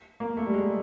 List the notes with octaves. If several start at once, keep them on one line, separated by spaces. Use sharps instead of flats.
A#3
A3
G3
G#3